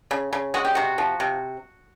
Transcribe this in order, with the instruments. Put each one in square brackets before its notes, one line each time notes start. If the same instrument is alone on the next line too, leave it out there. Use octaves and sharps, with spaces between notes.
[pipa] C#3
C#3
G#3 F#4
G4
C3 F#4
F3
C3